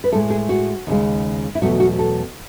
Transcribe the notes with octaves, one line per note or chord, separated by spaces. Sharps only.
B4
A2 G#3 A4
G#4
F#4
D#2 C#3 G#3
E4
E2 B2 F#3 A3 F#4
F#4
A4